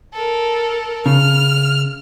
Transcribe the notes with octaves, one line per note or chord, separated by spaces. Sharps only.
A4 A#4
C#3 F6